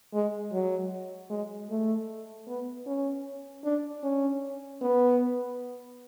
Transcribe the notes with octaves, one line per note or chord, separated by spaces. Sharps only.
G#3
F#3
G#3
A3
B3
C#4
D4
C#4
B3